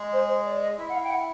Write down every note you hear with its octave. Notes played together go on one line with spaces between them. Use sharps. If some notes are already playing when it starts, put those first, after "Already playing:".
Already playing: G#3 G#4
C5
C5
D5
D#5
E4 E5
F#5
F5
G5
F#5